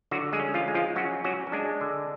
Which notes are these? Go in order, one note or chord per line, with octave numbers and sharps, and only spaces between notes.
D3 F#3 F#4
G#3 G#4
C#4
F3 F4
G#3
F3 F4
F#3 C#4 F#4
F#3 C#4 F#4
C#4
G#3 D4
D3